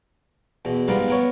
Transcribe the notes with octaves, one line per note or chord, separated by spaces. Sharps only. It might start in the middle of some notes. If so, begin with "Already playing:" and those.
E2 B2
G#2 G3 B3 F4 A#4
B3 A#4 C#5